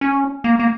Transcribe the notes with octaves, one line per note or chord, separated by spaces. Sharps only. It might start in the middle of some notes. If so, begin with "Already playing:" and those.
C#4
A#3
A#3